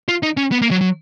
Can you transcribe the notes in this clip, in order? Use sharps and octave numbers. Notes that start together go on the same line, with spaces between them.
F4
D#4
C#4
B3
A#3
F#3
F#3